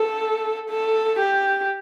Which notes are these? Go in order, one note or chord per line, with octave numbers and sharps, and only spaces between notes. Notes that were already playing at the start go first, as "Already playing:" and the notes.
Already playing: A4
A4
G4